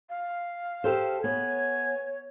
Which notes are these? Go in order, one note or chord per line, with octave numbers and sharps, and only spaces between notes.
F5
G4 A4 C5
B3 C#5 G#5